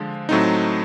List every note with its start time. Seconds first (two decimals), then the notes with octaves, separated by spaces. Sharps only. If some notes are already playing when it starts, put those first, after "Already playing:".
Already playing: D3 F3 G#3
0.29 A2 F#3 A3 C4 D#4